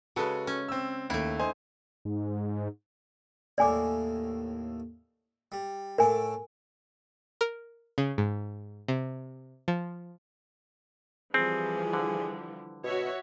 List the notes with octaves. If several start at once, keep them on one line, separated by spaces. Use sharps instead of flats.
C#3 G#3 F#4 A4 B4
C#4
C4 E6
D#2 A3 E4
D#4 C5 G#5
G#2
D#2 A2 D5 G#5 D6
G3
A2 A3 A#4 G#5 D6
A#4
C#3
G#2
C3
F3
E3 F3 G3 C4 G#4
D3
B2 F#4 C#5 E5